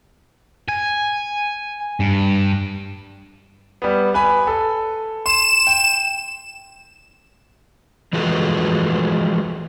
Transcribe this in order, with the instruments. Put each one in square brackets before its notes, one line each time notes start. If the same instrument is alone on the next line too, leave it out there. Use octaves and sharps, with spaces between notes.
[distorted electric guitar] G#5
G2
[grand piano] G3 B3
B4 G#5 B5
A4
[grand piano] C6 [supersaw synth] E7
[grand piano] G5
[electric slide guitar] E3 F3 G#3 F#4 A4 B4